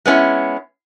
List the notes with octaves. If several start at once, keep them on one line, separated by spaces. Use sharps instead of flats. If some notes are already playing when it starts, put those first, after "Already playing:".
G#3 B3 C#4 E4